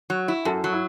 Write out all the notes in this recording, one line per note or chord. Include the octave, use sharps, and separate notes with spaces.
F#3
E4
F#2 F#4 A4
F#3
E4